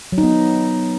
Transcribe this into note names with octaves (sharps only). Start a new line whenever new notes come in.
F#3
D#4
B3